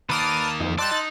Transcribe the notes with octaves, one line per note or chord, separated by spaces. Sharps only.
D#3 A#3 B4 D5 A5 D#6 F6
F2 D#4
D5 D#5 G5 A5 C6 E6 F#6 A6
D#4